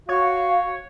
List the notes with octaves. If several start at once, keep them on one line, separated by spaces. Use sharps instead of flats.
F#4 C#5 F5